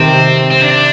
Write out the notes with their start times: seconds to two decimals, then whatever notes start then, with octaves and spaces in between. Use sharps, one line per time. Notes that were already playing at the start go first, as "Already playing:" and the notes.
Already playing: C3 D#3 C4
0.50 C4
0.63 D4